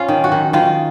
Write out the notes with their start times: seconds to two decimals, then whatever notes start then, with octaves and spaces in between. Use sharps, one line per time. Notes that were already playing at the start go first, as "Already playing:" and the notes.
Already playing: C#4 F4
0.08 D#3
0.24 F#4
0.32 D#3
0.53 D#3 F4